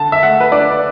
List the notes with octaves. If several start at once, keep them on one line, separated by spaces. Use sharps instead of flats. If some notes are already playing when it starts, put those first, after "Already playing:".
Already playing: D3 A5
E5
A3 F#5
B4
D4 D5